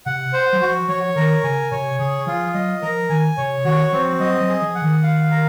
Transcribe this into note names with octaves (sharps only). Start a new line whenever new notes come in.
C3 F#5
C5
F#3
F3 F#4
F3 C#5
D#3 A#4
C#3 G#5
C3 C#5
C#3 G#4
F3 F4
F#3 D#5
F3 A#4
D#3 G#5
C3 C#5
D#3 F#4
F3 C4
F#3 D#5
F#3
G#4
F3
F#5
D#3
F5
A#4